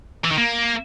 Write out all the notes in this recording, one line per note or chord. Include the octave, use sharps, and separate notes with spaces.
E3
D#3
A#3